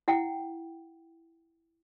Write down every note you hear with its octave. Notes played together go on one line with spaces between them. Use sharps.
E4 F#5 G5